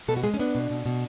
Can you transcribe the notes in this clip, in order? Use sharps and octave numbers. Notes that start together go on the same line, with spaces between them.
B2 A4
F#4
G#3 G#4
C#4
B3 D4
B2
B2
B2